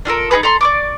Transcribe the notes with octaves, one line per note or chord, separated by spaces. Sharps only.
D4 F4 A4 A#4
D#4 F#4 G#4 B4
A4 A#5 C6
D5 C#6 D6